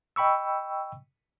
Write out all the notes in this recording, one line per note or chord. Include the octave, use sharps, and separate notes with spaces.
D#5 G5 B5 C#6 E6